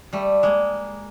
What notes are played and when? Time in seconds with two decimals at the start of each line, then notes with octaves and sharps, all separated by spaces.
0.13 G3 A3
0.43 G#3 A#3